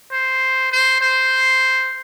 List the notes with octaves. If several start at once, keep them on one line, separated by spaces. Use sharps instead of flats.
C5
C5
C5